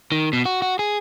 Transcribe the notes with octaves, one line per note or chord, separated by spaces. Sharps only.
D#3
B2
F#4
F#4
G#4